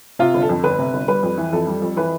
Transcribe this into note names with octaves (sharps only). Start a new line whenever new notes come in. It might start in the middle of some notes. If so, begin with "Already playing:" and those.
C3 F4
G1
A4
F2
G1 B4
C3
G1
G3 B4
F2
E3
F2 A4
G3
F2
E3 B4